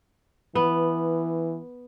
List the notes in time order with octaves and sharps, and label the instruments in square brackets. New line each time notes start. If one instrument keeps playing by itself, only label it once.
[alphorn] E3 [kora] B3